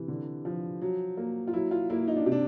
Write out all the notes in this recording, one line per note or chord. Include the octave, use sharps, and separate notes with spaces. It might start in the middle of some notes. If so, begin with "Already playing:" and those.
Already playing: C3 E3
D3
F3
F#3
A#3
F4
F#3 E4
F4
A#3 E4
D#4
D4
C3
D4